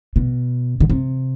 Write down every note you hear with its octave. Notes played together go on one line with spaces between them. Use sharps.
B2
D3
C3